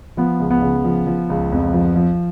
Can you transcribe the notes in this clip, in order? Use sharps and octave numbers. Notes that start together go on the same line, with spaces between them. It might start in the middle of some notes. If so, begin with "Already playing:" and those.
F3 B3
C#2
B3
C#3
F3
F3
C#2
F2
F3
F3